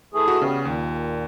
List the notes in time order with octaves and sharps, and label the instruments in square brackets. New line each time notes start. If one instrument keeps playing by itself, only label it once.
[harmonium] E3 A3 G#4
[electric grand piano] F#4
[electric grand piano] C#3 [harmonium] G3 B3 C#4
[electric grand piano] D#2 [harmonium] A#2